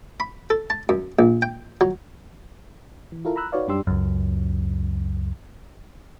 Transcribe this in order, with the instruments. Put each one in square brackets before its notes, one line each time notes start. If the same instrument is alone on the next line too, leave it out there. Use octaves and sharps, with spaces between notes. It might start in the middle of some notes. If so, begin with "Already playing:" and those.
[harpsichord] B5
A4
A5
F#2
A#1
G5
F#3
[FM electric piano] E3
E4 F4 A4 A#4
A#5 B5 E6 F#6
D#4 F#4 B4 C#5 D5 F5
F#2 G3 D4 G4 C6 E6
[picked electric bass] C#2 F#2